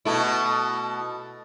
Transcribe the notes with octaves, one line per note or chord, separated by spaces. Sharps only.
B2 A3 E4